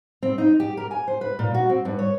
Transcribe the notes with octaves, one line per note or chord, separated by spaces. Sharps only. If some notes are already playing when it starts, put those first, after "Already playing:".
C4
D#4
G4
A#4
G#5
C5
B4
A#2
F#4
C4
G2
C#5